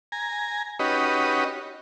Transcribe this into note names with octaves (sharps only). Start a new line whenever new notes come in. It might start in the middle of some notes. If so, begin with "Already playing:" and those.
G#5 A#5
C#4 D#4 F#4 G4 B4 D#5